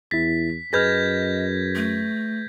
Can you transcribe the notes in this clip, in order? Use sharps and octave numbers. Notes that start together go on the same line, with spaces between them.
E2 E4 A6 B6
F#2 G#4 B4 D#5 F6 G6 G#6 A#6
A3